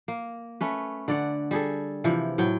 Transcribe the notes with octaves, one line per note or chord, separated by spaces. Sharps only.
A#3
A3 C#4 B4
D3 D5 F#5
G3 G#4 A4
C3 E3 F3
A2 F#3 G5